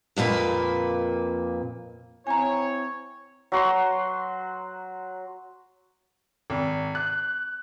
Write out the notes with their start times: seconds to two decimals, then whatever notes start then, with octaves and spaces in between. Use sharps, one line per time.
0.16 F2 A#2 A#3 B4
2.27 C4 E4 C#5 G#5 A#5
3.52 F#3 F#4 C6
6.50 G#1
6.95 F#6